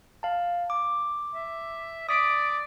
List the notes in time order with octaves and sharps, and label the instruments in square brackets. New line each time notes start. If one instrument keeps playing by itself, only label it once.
[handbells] F5 A5
D6
[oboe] E5
[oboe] D5 [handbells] D#6 B6 D7